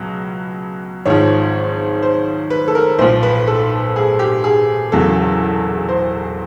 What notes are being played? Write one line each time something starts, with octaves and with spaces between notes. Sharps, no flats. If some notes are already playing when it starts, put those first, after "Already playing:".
Already playing: C#2 B2 F#3
G#1 G#2 F3 C#5
C5
B4
A4
A#4
B1 A#2 F3 C5
B4
A4
G#4
G4
G#4
E1 E2 C#3 F#3 A4
C5